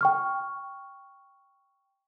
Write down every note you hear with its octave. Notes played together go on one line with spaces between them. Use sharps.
G5 C#6 F6